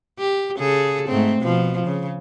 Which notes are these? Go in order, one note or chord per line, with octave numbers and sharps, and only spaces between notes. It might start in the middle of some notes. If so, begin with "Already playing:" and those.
G4
C#3 G#4 A4
G#2 A3 C4
B2 F3
C#3